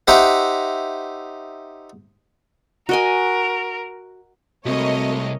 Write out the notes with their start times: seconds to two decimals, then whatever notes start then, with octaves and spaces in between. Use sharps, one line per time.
0.08 D#4 G4 C5 E5 F#5
2.89 F#4 A#4 D#5 G#5
4.66 C2 G#3 A3 C4 F#4 A#4 C#5 D#5